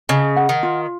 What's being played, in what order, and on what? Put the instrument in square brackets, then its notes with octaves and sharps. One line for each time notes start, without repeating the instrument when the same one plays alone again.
[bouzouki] C#3 [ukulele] D#5
[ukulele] F#5
[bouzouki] D#3
[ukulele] F4